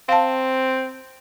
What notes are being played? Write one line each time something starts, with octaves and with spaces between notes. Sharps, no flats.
C4 F5 A5